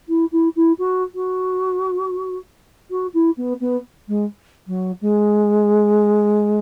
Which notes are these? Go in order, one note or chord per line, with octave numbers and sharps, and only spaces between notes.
E4
E4
E4
F#4
F#4
F#4
E4
B3
B3
G#3
F#3
G#3